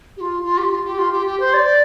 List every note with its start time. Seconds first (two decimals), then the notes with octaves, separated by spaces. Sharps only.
0.17 G4
0.20 F4
0.44 F4
0.58 G4
0.71 F4
0.85 G4
0.99 F4
1.12 G4
1.26 G4
1.40 C5
1.54 D5